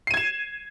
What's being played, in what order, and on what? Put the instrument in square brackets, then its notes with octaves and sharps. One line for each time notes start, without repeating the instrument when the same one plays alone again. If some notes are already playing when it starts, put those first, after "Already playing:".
[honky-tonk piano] C7
D#7
G#6
E7